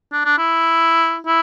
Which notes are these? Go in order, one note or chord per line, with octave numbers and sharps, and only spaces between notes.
D4
D4
E4
E4